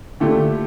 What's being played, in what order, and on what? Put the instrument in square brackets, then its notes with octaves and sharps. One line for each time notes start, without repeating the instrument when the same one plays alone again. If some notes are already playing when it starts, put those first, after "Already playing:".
[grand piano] A#2 A3 E4 G4 [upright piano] D3